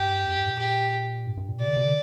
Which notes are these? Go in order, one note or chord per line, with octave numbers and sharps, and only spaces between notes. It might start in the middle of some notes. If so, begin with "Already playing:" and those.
Already playing: G2 G4
F2
G2
A#2
G4
G2
G2
A#2
C3 D5
D3
C3
D3